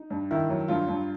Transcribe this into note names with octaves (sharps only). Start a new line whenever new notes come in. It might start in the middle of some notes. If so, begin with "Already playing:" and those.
Already playing: D#4
G2
D#3 E4
F#3
G2 F4
G2